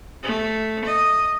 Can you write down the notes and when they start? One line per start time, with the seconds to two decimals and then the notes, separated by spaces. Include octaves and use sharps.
0.23 A3
0.85 D#5